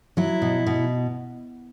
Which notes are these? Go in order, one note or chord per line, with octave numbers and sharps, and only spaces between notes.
F#3 E4
B2
B2